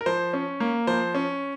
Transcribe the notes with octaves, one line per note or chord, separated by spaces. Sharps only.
A#4
F3 C5
C#4
A#3
F3 C5
C#4